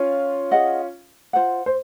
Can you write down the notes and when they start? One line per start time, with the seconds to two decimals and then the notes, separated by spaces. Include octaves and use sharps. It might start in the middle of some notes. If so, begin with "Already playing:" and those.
Already playing: C#4 F4
0.51 G#4 D#5 F#5
1.33 F4 C5 F#5
1.66 C5